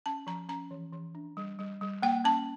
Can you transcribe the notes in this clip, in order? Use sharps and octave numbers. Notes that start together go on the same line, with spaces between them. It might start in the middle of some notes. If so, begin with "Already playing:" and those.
C#4 A5
F3 A#5
C#4 A#5
E3
E3
D4
G3
G3
G3
A#3 G5
C#4 A5